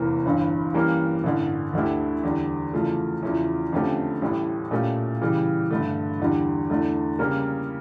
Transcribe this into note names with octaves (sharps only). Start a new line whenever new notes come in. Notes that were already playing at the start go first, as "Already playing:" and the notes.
Already playing: F1 E2 E3 A#3
G1 G2 E3
E3 G3 A#3 C#4
A1 G2 D3
D2 D3 A3 E4 G4
E2 D3 G3
E2 C#3 F3 A3
E2 C#3 F3 C#4 E4
F2 D3 A3 C#4 G4
A1 A2 G3
A#2 A3 C#4 G4
C#3 E3 G3
G2 D3 A3
E2 D3 G3
E2 D3 A3
C#3 G3 A#3 C#4